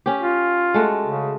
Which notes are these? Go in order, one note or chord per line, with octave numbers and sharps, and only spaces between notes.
C#4 G4
F4
G#3 A3 F#4
C#3